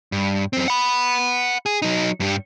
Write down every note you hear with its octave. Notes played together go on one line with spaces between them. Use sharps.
G2
F#2 C4
F#5 B5
G#4
F#3 D#4
G2 G3